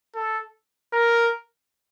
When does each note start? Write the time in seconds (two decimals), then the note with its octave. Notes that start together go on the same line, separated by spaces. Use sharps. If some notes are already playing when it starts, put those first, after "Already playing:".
0.15 A4
0.93 A#4